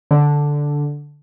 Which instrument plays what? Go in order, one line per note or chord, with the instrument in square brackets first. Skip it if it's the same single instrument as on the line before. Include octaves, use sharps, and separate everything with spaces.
[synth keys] D3